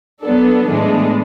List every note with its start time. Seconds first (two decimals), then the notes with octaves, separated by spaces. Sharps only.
0.23 F#3 B3 D4 A4
0.67 A2 E3 G#3 B3 D4